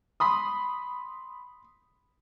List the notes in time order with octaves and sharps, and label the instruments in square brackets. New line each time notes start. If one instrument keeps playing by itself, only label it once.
[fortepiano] B5 C6 D#6